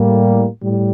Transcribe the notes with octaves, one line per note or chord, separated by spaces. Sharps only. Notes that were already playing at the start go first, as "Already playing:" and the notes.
Already playing: A2 G3 A#3
A2 G3